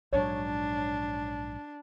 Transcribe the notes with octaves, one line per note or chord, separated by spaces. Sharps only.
A#1 G#2 F#3 D4 C#5